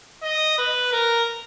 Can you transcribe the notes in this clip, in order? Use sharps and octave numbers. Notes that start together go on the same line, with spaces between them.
D#5
B4
A#4